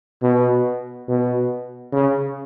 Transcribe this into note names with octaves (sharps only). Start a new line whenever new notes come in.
B2
B2
C#3